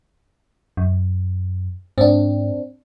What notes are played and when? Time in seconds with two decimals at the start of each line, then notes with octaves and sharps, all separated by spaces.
0.77 F#2
1.98 G#2 C4 D4